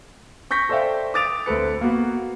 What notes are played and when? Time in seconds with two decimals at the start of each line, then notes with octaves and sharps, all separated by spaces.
0.51 C#6 G6 A#6 B6
0.69 A4 C5 D5 E5 F5 G5
1.14 D6 D#6 A6 D7 F7
1.46 D2 C4 A4 B4 C#7
1.81 A#3 B3 F#4